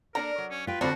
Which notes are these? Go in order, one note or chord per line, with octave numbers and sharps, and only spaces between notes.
A#3 D4 A4 A#4 A#5
F#3
C#4
F4 B4 G5
D3 F3 G3 C4 D4 F#4